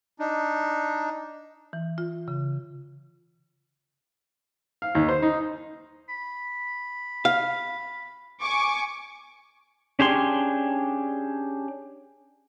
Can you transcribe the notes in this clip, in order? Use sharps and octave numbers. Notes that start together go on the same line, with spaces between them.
D4 D#4
E3
F4
C#3
F5
D#2
C5
D#4
B5
F5
G#5 C#6 D6
C#4 D4 G4 G#4 C6